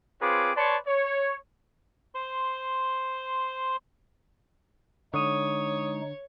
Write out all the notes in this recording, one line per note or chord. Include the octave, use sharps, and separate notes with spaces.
C4 F4 G#4 B4 C#5 D6
B4 C#5 D5 A5 C6 C#6
C#5
C5 C6
D3 G#3 D#4 C#5 C#6 D#6 D#7